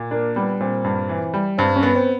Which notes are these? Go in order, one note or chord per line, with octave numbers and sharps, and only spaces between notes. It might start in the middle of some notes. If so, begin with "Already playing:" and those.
Already playing: A#2
A#3 D4
G3 B3
A#2 C4
G2
E3
G3
G2 C4
C#4
B3
C4